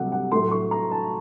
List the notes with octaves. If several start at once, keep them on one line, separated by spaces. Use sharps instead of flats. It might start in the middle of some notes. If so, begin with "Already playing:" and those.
Already playing: C2 C3 F#3 A3 F#5
F#5
A2 F#3 A3 C6
C#6
A#5
A5